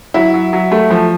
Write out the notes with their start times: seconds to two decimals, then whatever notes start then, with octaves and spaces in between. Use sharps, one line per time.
0.14 F#3 E4
0.34 F#3
0.53 F#3
0.72 A3
0.91 F3